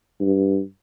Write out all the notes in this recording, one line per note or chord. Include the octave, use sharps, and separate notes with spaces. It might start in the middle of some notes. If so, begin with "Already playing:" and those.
G2